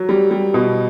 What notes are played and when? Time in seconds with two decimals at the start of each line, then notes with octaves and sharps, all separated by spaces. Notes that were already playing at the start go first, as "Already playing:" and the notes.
Already playing: F#3
0.09 G3
0.31 G3
0.54 B2